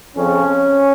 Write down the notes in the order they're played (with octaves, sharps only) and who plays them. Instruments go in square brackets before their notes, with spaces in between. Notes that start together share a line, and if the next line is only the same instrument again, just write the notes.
[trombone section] F2 C#3 F3 C#4